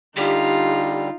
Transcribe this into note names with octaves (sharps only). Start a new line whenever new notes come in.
D3 G3 D#4 F4 G4